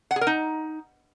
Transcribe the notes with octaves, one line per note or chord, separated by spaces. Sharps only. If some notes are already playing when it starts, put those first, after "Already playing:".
F#5
G#4
A#4
D#4